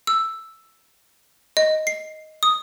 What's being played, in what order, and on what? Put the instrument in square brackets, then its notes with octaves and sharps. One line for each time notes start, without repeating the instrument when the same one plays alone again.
[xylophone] E6
D#5
C7
D#6